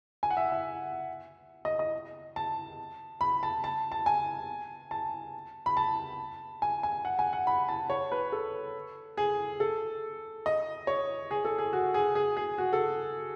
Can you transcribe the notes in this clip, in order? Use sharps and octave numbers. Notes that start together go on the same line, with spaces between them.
G#5
F#5
E5
E5
D#5
D#5
A5
B5
A5
A5
A5
G#5
A5
B5
A5
G#5
G#5
F#5
G#5
F#5
B5
A5
C#5
B4
A4
G#4
A4
D#5
C#5
G#4
A4
G#4
F#4
G#4
G#4
G#4
F#4
A4